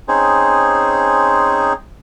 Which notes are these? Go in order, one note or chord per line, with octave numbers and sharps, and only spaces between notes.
C4 C#4 D#4 G#4 C5